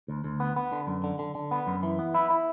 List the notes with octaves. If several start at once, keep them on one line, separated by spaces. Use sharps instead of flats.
D2
D2
B3
B3
D3
F#2
D3
D3
D3
B3
F#2
E3
B3
E4
E4